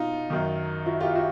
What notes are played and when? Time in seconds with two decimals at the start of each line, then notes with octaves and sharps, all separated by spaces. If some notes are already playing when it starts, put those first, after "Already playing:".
Already playing: B2 D#4 F4
0.30 F#2 D#3
0.86 E4 F#4
1.00 F4 G4
1.15 E4 F#4